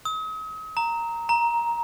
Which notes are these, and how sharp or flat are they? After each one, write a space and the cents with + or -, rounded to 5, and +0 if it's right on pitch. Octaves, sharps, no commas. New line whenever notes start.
D#6 +40
A#5 -5
A#5 +10